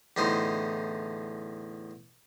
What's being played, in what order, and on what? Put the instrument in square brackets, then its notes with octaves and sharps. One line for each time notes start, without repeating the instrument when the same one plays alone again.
[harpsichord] E2 A2 D3 D#4 C5